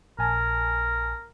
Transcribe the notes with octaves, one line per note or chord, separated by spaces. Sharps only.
A#1 A#4 G#5 A5